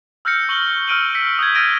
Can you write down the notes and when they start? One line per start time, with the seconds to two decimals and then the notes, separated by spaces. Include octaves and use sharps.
0.25 E6 F6 G6 A#6 C#7
0.49 C#6 F#7 G7
0.88 E6 F6 D7 D#7 F#7
1.15 E6 B6 C#7
1.39 D#6 G6 G#6
1.55 E6 F6 A6 A#6 D7 D#7